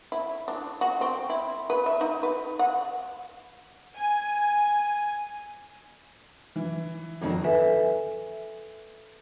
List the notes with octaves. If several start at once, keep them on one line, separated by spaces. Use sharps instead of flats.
E4
D4
F#4
C4
E4
B4
E5
D#4
B4
F#5
G#5
E3
G#1 F2 D#3 F3 F#3
A4 B4 E5 G#5